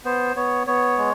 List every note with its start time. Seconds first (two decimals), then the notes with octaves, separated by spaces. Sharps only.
0.05 B3 C5
0.36 B3 C#5
0.67 B3 C#5
0.98 G#3